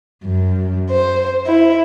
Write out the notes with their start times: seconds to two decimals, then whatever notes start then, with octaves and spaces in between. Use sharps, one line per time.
0.24 F#2
0.91 C5
1.46 E4